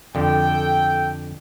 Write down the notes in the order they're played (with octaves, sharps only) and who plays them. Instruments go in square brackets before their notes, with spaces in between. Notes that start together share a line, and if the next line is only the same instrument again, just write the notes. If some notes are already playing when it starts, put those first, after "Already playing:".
[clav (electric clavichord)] F2 D3 [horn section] A4 G5